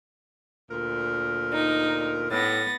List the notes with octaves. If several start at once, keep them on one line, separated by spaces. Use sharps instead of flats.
D2 A#2 A#4
D#4
A2 B3 A6 A#6